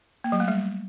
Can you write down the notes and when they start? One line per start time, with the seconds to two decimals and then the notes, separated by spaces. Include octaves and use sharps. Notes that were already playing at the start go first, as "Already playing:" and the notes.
0.24 A#3
0.32 F#3
0.40 A3
0.48 G3